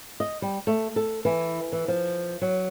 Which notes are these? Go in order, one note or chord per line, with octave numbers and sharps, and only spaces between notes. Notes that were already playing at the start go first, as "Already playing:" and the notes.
D#5
G3
A3
A4
E3
E3
F3
F#3